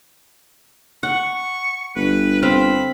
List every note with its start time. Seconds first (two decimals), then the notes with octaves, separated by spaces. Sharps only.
1.03 F#5 C#6
1.96 G1 B4
2.43 C4 F5 B5